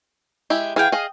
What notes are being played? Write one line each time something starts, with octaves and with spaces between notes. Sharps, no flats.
G#3 E4 G4
E3 G#4 F5 G5
G#4 D#5 F5